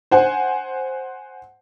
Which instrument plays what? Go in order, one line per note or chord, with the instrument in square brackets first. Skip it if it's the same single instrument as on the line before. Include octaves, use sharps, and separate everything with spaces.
[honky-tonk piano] C5 F#5 G#5